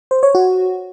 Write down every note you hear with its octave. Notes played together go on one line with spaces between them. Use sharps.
C5
C#5
F#4